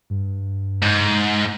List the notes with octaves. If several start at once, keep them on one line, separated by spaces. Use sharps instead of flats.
G2
G#2